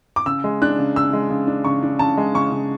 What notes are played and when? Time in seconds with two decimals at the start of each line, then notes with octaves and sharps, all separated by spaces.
0.16 D6
0.26 C#3 E6
0.44 G#3
0.62 D4 F#6
0.79 C#3
0.96 C#3 E6
1.13 G#3
1.30 C#3
1.47 D4
1.64 C#3 C#6
1.83 D4
1.99 C#3 A5
2.17 G#3
2.34 C#3 C#6
2.52 C#3